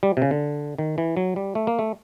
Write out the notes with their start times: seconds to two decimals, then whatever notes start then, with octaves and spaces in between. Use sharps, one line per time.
0.03 G3
0.17 C3
0.22 C#3
0.31 D3
0.78 D#3
0.98 E3
1.17 F#3
1.36 G3
1.55 A3
1.67 A#3
1.79 A3